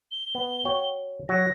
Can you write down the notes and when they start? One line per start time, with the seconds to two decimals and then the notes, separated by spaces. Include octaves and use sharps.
0.11 G7
0.35 B3
0.65 F#4 C#5 G5
1.29 F#3 F#4 A#6